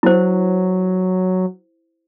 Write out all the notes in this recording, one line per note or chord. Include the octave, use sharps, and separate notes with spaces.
F#3 E4 C5